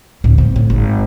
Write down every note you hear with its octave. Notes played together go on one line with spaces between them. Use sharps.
D2 A2
C4
A2
G#1